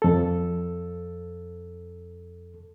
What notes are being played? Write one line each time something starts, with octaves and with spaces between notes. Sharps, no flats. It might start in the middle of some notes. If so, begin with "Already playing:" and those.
F2 A4